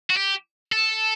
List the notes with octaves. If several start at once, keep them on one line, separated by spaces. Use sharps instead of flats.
F#4
G4
A4